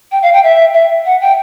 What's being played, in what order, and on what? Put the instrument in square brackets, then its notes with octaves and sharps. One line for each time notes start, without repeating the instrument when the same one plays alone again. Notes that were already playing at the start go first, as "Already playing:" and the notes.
[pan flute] G5
F5
G5
E5
E5
F#5
G5